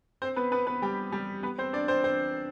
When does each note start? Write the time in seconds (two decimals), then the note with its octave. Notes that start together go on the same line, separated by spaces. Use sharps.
0.22 C4 C5
0.36 B3 B4
0.52 B3 B4
0.67 B3 B4
0.82 G3 G4
1.12 G3 G4
1.43 B3 B4
1.58 C4 C5
1.73 D4 D5
1.88 C4 C5
2.04 C4 C5